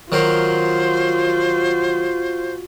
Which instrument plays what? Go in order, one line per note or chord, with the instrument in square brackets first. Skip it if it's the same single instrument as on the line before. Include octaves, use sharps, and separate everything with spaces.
[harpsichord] D#3 F#3 A#4 [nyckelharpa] F4 F#4 [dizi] C5